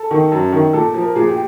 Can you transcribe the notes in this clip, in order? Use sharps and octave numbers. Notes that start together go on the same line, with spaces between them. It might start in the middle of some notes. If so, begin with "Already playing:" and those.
Already playing: A4
D#3
F#2
D#3
A#2 A4
F3
A#4
A#2 G#4
G4